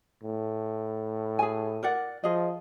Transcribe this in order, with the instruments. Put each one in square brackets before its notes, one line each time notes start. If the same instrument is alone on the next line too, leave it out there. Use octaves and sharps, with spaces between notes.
[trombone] A2
[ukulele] G#4 G#5
A#4 D5 F#5
[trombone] F3 [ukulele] G#4 D#5